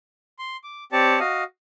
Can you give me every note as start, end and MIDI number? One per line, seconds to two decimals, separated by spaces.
0.39 0.57 84
0.64 0.84 86
0.92 1.19 60
0.92 1.19 67
0.92 1.19 73
0.92 1.19 74
0.92 1.19 81
1.20 1.44 66
1.20 1.44 75
1.20 1.44 77
1.20 1.44 87